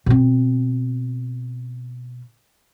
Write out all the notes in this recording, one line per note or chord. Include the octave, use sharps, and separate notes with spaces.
B2 C4